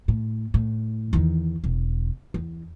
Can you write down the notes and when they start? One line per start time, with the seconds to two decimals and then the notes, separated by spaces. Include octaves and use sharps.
0.08 A2
0.54 A2
1.13 E2 D#3
1.64 E1
2.34 E2